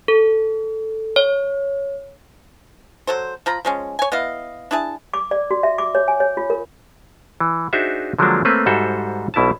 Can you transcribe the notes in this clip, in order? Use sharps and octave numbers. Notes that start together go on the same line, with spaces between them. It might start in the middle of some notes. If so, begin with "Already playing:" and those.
A4
C#5
F#3 A4 C5
F3 F4 A#5 B5
F3 G#3 C#4
C#5 G#5
B3 E4 D#5 F5
D4 E4 G#4 A5
D6
D5
F#4
E5
D6
C#5
G#5
C#5
F4
A#4
E3
D4 D#4 F#4 G#4 C5 E5
D3 F3 F#3 G#3 A#3 D4
A3 A#3 C4 B4 C#5
G#2 G3 F#4 A4 C5 E5
B1 B2 E4 B4 A5